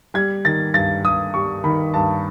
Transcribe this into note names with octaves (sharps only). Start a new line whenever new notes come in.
G3 G#6
D#3 A6
G2 A6
G2 D#6
G3 C#6
D#3 B5
G2 A5